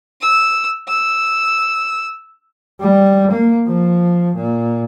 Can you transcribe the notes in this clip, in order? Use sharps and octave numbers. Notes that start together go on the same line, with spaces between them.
E6
E6
G3
A#3
F3
A#2